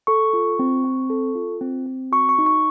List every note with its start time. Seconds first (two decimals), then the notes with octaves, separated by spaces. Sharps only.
0.07 A4 C#6
0.33 F4
0.59 C4
0.84 C4
1.10 A4
1.35 F4
1.61 C4
1.86 C4
2.12 F#4 C#6
2.29 C#6
2.39 D#4
2.46 C#6